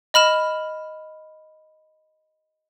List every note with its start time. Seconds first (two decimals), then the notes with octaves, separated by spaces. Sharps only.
0.14 D#5 B5 F6 E7